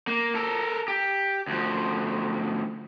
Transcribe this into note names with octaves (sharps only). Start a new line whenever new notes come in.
A#3
A4 A#4
G4
D2 F3